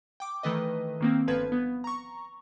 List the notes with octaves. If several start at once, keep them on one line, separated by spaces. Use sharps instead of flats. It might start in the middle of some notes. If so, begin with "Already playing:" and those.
G5 D6
D#3 E3 A3 B4 D#5
D#3 A#3 C4
G1 F3 B4 G#6
B3
A#5 C#6